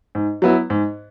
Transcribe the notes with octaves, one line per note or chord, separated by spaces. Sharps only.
G#2
F#3 B3 E4
G#2